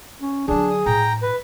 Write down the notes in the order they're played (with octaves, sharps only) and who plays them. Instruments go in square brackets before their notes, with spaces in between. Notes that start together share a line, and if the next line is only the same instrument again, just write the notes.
[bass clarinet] C#4
[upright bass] D3 F#3 [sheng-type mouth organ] D4 [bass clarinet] G#4
[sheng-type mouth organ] D#6
[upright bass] A2 [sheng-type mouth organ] G5 A#5
[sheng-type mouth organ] B4